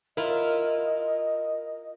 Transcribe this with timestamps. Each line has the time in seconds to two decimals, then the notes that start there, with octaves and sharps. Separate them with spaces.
0.17 E4 F4 A#4 D#5